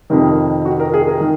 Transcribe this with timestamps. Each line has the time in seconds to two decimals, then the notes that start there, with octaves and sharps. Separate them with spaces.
0.10 F2 C3 D#3 A#4
0.65 F#4
0.80 A#4
0.94 G#4
1.07 A#4
1.21 D#3